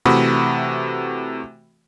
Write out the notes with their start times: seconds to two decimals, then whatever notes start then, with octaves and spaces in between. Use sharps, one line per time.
0.06 C3 E3 A3 F#4 B5 D#6